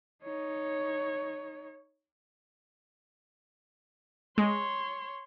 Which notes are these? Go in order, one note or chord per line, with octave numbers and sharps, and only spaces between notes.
D#4 C#5
G#3 C#5 C6